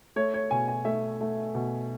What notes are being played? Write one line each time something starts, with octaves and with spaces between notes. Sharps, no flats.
A3 C#5
C#5
B2 G#5
G#5
A3 E5
A3
B2